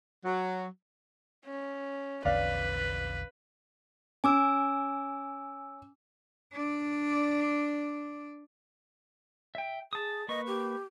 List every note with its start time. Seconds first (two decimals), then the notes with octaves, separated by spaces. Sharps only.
0.25 F#3
1.46 C#4
2.25 A#1 E2 D3 B4 D5 F5
4.24 C#4 G#5 D6 E6
6.53 D4 D5
9.55 E5 G5
9.93 G#4 A5 D#6
10.28 A#3 B4 D#5 C#6
10.47 G4